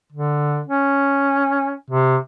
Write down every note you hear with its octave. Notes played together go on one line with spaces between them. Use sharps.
D3
C#4
C3